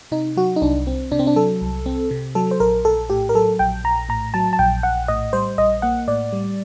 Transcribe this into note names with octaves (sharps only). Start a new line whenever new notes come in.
C3 D#4
F#3 F#4
D#4
C2 D4
C4
C3 D4
C4
D4
F#3 A4
C2
C4
C3
F#3 A4
C5
A#1 A#4
A#1 A4
A2 G4
A#4
F#3 A4
A#1 G5
A#1 A#5
A2 A#5
F#3 A5
A5
A#1 G5
A#1 F#5
A2 D#5
G3 C5
A#1 D#5
A#3 F#5
A2 D5
G3